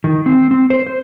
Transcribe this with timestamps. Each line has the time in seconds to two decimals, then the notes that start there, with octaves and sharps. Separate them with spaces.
0.04 D#3
0.26 C4
0.51 C4
0.70 C5
0.87 C5